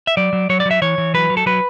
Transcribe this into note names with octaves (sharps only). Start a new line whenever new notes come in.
E5
F#3 D5
F#3
F#3 C#5
D5
F#3
E5
E3 C#5
E3
F#3 B4
F#3
A4
F#3 B4